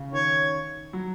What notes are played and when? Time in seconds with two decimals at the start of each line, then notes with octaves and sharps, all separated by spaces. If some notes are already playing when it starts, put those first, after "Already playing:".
Already playing: C#3
0.12 D#3 C#5
0.93 F#3